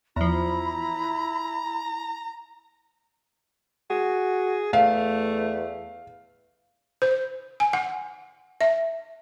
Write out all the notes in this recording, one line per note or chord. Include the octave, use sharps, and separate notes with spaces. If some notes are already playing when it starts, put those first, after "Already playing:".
E2 F3 E4 A#5 B5
F#4 G#4
E2 A3 F5
C5
G#5
F#5
E5